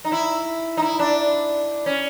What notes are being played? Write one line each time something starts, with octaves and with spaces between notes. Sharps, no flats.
D#4
E4
D#4
E4
D4
C#4